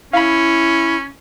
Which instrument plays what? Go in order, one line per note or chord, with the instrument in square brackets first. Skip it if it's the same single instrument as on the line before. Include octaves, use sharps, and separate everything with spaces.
[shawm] C#4 [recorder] E4 [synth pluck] F5 B5